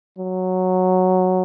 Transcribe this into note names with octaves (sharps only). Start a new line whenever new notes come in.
F#3